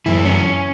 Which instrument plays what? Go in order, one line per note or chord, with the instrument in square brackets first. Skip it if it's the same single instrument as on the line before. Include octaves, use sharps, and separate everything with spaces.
[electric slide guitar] F#2 E3 E4
C#4